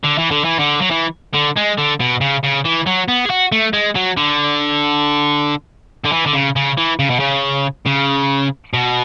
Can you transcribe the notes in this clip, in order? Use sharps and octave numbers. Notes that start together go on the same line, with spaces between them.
D3
E3
D3
E3
D3
F#3
E3
D3
G#3
D3
B2
C#3
C#3
E3
F#3
B3
G#4
F#4
A3
G#3
F#3
D3
D3
E3
D3
C#3
C#3
E3
C#3
B2
C#3
C#3
B2